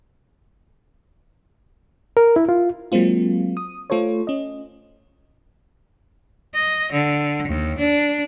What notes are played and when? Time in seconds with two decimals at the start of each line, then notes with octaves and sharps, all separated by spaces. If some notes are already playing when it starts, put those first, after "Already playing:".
2.17 A#4
2.36 E4
2.49 F4
2.92 F#3 G#3 A#3 C4 F4
3.57 D#6
3.90 A3 F4 A4 C5 C#5
4.27 C#4 D#5
6.54 D#5
6.92 D3
7.48 D#2
7.78 D4